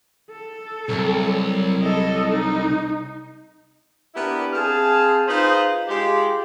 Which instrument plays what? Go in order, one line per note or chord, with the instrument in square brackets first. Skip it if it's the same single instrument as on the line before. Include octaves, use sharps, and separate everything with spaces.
[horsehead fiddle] A4
[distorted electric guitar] C2 [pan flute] F#3
[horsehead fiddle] A4 D#5
D#4
[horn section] B3 D4 E4 G4 A#4
C4 G#4 F5 A5
D#4 F4 G#4 B4 C5
G#3 F4 G4